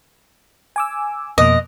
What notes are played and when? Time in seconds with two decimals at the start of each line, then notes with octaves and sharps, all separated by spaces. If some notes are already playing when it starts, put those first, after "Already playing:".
0.76 G#5 D6 E6
1.38 F2 B2 A#3 D#5